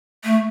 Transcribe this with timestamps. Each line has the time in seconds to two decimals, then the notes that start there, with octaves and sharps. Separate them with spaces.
0.24 A3